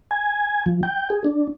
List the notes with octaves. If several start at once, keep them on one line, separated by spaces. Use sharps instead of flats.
G#5
F3
G5
G#4
D4